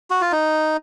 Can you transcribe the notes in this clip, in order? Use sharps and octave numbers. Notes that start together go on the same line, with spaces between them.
F#4
F4
D#4